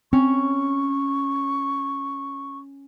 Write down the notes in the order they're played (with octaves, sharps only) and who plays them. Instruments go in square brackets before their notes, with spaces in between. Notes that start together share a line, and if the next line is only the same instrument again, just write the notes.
[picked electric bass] C4 [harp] C#4 [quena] C#6